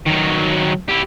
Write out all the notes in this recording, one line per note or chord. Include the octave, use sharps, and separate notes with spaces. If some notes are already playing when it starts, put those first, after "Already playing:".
D#3 F#3
E4 G4